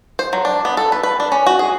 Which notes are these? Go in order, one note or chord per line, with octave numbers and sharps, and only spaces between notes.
C5
F#3
D4
B3
A4
B4
B4
D4
C#4
F#4
G#4